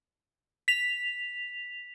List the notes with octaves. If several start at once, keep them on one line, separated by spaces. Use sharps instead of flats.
B6 F7